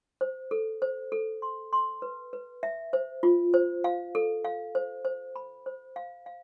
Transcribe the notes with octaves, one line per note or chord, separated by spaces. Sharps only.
C5
A4
C5
A4
C6
C6
B4
B4
E5
C5
F4
C5
F5
A4
F5
C5
C5
B5
C5
F5
F5